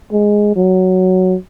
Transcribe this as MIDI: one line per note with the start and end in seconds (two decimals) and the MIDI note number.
0.12 0.53 56
0.56 1.35 54